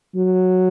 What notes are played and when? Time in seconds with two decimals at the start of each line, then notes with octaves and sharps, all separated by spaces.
0.15 F#3